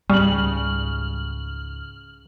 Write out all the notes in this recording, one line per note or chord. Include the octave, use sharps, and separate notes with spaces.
C#2 G#2 C#3 G3 F6 F#7